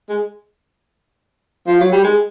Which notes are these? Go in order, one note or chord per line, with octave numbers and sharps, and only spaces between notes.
G#3
F3
F#3
G3
G#3